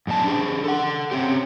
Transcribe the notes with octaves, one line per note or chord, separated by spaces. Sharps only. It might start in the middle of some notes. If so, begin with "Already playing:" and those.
F#2 B2 D4 A5
D4 G4 G#4
A4 F#5
C4 C#4 G4